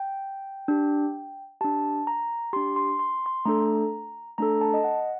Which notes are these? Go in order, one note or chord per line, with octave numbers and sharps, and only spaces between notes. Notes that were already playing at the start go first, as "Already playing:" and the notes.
Already playing: G5
D4 G4
D4 G4 A5
A#5
D4 G4 C6
C6
C6
C6
A3 D4 A4 A#5
A3 D4 A4 A#5
A5
D#5
F#5